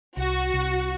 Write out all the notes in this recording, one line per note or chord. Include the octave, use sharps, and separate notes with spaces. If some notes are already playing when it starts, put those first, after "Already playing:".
C2 F#4
C2